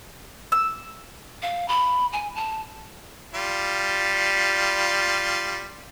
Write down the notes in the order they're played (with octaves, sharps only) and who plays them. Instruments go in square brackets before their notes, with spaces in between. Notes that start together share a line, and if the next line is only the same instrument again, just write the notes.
[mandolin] E6
[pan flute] F5
B5
G#5
A5
[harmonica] G3 F4